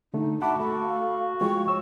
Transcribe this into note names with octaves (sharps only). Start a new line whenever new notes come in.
D3 A3 D#4
F#4 E5 F#5 A5 B5 D6
A3 A4 B5
F5
F3 G#3 F4 G5 C#6
C#5 E6